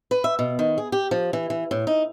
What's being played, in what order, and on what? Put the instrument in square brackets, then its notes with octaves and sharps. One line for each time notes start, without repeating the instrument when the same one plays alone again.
[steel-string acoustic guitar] B4
E5
B2
D#3
G#4
G4
F3
E3
E3
A2
D#4